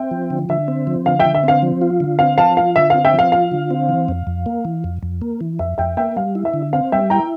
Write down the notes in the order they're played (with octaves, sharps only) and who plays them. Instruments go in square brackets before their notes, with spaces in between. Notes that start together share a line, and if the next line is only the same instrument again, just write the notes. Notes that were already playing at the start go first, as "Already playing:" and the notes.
Already playing: [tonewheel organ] C4 [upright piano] E5 G5
[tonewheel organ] F3
D3
[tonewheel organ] D3 [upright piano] E5
[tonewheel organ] C4
F3
[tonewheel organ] D3 [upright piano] F5
[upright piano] E5 G5
[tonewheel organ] D3
[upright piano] E5
[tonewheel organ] C4 [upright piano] F5
[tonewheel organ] F3
F4
D3
[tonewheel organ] C4 [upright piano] F5
[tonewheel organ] F3 [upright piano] F5 A5
[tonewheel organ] F4 [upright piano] F5
[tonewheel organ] D3 [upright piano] E5
[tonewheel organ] C4 [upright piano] F5
[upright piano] E5 G5
[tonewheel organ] F3
[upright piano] F5
[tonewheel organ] F4 [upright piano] F5
[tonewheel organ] D3
C4
E3
F2
F2
A#3
E3
F2
F2
A#3
E3
[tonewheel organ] F2 [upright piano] E5
[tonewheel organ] F2 [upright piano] E5 G5
[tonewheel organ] A#3 [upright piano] E5 G5
[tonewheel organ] G3 [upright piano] F5
[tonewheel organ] E4
[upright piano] E5
[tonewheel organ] D3
[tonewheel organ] C4 [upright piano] F5
[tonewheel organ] G3 [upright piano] E5 G5
[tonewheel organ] E4 [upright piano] G5 A#5